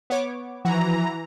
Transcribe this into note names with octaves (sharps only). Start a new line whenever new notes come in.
B3 C#5 D6
E3 F3 F#4 A#5